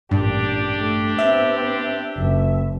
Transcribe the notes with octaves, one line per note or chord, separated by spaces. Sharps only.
A1 G2 A#2 D4 G4
A3
B3 C4 E5
F#1